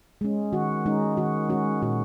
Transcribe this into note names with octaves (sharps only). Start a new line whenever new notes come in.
G#3 C#4
D#3 F#4
G#3 C#4 D#4
D#3 F#4
G#3 C#4 F#4
A#2 F#4